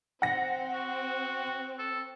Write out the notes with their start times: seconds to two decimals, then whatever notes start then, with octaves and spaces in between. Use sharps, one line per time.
0.22 C4 F#5 A#6
0.74 F#4
1.78 A4